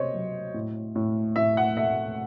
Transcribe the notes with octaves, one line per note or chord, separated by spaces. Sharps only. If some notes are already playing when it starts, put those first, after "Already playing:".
Already playing: C3 C5 C#5 D#5
F#3
A2
A2
A2 E5
F#5
A3 E5